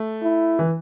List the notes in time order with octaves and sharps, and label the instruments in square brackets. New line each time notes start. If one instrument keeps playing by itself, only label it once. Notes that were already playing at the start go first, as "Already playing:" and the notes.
Already playing: [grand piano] A3
[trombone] E4
[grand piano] E3